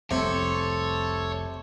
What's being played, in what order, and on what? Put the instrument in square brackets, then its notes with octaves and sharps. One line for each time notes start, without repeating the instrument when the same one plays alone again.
[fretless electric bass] F1 C2 [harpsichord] C3 [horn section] A4 [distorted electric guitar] C#5